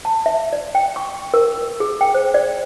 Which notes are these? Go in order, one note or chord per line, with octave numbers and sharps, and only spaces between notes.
A5
E5
D5
G5
C#6
A#4
G#4
G5
C5
D5